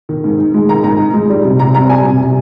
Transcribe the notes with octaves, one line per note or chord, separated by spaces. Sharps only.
D#3
G#2
D#4
G#3
D#3 A#5
G#2 A#5
D#4
G#3
G3
C3
C3 A#5
C4 A#5
G3 G#5
C3
C3